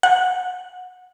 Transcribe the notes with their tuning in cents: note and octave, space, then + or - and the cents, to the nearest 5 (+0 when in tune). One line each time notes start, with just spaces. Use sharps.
F#5 -20